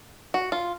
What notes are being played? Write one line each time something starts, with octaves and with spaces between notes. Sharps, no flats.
F#4
F4